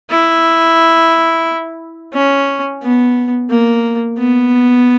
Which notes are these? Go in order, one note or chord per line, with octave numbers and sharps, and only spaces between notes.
E4
C#4
B3
A#3
B3